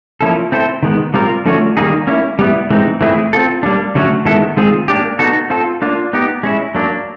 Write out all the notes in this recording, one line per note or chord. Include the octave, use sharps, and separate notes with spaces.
F3 A#3 C#4 E4 A4
C4 E4 A4 C5
D#3 G#3 B3
G3 C4 F4 A#4
D3 F3 A3 C#4 F#4
D#3 G3 A#3 D#4 G#4
A#3 C#4 E4
G3 B3 E4
E3 G#3 C4 D#4
E3 A3 C4 E4 G#4
C4 F4 A4
G3 A#3 D4
D3 F#3 A3 C#4 F#4
D#3 G#3 B3 E4 A4
D#3 G#3 C4 F4 G#4
A#3 D4 G4
B3 D#4 F#4 A4
C4 F4 A4
A#3 D4 F4
B3 D#4 G4
G#3 C#4 E4
F#3 A#3 D4